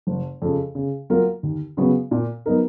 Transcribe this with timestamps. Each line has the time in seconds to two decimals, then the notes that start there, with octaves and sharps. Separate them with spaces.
0.07 F#1
0.42 F2 C#3
0.75 C#3
1.10 F#3 A#3 F4 A#4
1.43 D#2
1.77 C#3 F#3 B3 F#4
2.11 A#2
2.46 F#3 B3 D#4 A#4